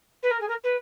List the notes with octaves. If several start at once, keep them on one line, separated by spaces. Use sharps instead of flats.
B4
A#4
G#4
A#4
B4